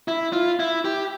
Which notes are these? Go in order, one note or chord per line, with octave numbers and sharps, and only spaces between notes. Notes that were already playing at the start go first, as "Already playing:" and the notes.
E4
F4
E4
G4